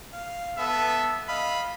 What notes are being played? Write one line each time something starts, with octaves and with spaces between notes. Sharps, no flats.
F5
B3 A4 E5
D#5 F5 B5